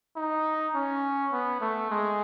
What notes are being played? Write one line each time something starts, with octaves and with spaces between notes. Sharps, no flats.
D#4
C#4
B3
A3
G#3